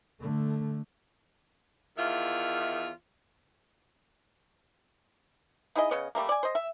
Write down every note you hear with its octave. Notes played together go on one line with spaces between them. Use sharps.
D3 A3
E2 D#3 F4 E5
D#4 E4 G#4 D#5
C#3 B3 C#5 D#5
G3 A3 A#3
D5 G#5
C5 D#5
E5